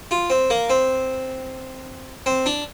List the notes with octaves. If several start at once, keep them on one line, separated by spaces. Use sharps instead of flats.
F4
C4
A#3
C4
C4
D4